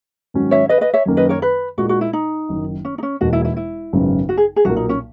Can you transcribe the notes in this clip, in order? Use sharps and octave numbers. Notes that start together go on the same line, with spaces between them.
G#2 D#3 F#3 C#4
C#5 E5
B4 D#5
B4 D#5
C#5 E5
F#2 D#3 A#3 C#4
B4 D#5
A#4 C#5
B4
A#2 G#3 D#4 F#4
F#4
E4
D#4
F#1 F#2 D#3
C#4
D#4
C#4
E1 E2 B2 A#3 D#4 F#4
E4
E4
E4
G#1 F#2 C#3 G#3 B3
F#4
G#4
G#4
B1 A#2 F#3 A#3 F#4
D#4
C#4